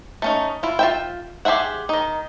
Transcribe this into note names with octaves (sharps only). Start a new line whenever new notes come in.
A3 C#4 D#4
E4 F4
F4 E5 G5
G4 G#4 C5 E5 F#5
D#3 D#4